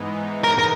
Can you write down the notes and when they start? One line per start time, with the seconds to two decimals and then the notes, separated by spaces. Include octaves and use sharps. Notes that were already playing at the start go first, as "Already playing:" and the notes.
Already playing: G#2 E3 G#3 B3 D#4
0.44 A#4
0.59 A#4